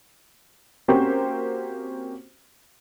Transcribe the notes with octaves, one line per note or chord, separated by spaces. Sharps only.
A#3 C4 C#4 F#4 G4 C5